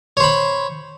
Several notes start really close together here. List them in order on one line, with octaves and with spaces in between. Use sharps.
C#5 C5 B5